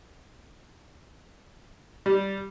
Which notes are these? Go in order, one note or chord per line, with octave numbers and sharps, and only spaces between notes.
G3